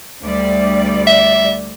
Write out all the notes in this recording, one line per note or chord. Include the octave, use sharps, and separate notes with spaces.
D2 G3 D5
E5